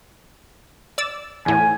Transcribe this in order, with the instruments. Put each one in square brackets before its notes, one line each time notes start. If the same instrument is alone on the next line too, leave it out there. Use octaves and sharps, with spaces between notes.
[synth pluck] D5 E6 A6
[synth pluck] E2 A2 [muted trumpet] G#5